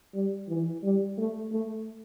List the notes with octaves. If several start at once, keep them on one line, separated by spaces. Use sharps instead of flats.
G3
E3
G3
A3
A3